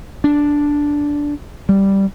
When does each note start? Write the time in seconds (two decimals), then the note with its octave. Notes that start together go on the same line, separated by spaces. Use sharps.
0.24 D4
1.69 G3